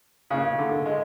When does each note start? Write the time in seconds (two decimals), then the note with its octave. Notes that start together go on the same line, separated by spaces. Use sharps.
0.30 C#3
0.59 D3
0.86 G#3